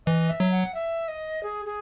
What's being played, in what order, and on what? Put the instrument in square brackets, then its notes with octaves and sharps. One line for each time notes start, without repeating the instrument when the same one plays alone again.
[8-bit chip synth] E3 [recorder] D#5
[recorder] E5
[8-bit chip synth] F#3
[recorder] F#5
E5
D#5
G#4
G#4